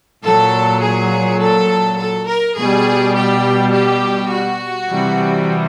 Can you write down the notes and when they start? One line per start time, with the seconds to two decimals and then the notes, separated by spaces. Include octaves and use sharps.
0.25 A#2 F#3 A4
0.82 G#4
1.42 A4
1.99 A4
2.28 A#4
2.57 B2 G3 G#4
3.15 G4
3.74 G4
4.32 F#4
4.90 C3 E3 G3